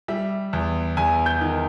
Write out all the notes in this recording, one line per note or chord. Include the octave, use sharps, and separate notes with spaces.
G3 E5
E2
E2 G#5
G6
D#3